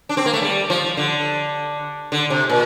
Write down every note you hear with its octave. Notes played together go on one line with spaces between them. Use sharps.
D4
C4
A#3
A3
G3
F3
D3
D3
C3
A#2